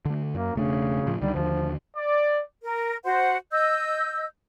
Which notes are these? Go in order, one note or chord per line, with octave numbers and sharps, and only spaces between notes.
D3 A3
F#2 A#3
E1 C#3 A3 D4
A2 F3
C#2 D3 D#3 G3
D#2 D3 F3
D5
A#4
F#4 C5 F#5
D#5 E6 G6